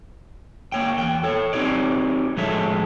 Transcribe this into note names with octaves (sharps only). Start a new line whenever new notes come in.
A#3 C#5 G5
E2 G5
A4 C#5
C4 D#4 G4 C#5 D5
A2 F3 G#3 A4 C#5 E5